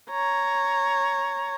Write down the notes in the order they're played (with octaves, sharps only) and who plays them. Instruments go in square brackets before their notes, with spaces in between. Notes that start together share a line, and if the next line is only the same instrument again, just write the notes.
[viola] C#5 A#5